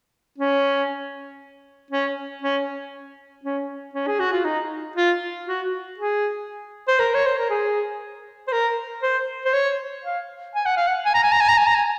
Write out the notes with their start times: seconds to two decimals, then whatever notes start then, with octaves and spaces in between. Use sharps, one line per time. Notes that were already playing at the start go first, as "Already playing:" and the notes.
0.38 C#4
1.91 C#4
2.42 C#4
3.43 C#4
3.94 C#4
4.07 G#4
4.19 F#4
4.32 F4
4.44 D#4
4.96 F4
5.46 F#4
5.98 G#4
6.88 C5
6.99 A#4
7.14 C#5
7.26 C5
7.38 A#4
7.50 G#4
8.47 C5
8.52 A#4
9.03 C5
9.45 C5
9.53 C#5
10.04 F5
10.55 G#5
10.66 F#5
10.77 F5
10.87 F#5
11.06 G#5
11.14 A#5
11.23 G#5
11.32 A#5
11.40 G#5
11.49 A#5
11.58 G#5
11.67 A#5
11.75 G#5